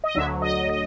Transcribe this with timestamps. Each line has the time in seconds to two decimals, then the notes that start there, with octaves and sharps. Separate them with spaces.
0.04 D#5
0.15 D2 D3 F#3 E5
0.42 D#5
0.69 D#5